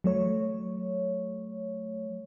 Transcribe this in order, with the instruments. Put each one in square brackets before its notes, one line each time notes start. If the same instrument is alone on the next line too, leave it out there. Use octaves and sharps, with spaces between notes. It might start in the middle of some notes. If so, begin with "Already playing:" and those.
[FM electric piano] F#3 A3 C#5